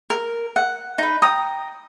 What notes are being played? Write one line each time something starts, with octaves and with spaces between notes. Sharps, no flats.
A#4
F#5
D#4 B4
G5 A#5 D#6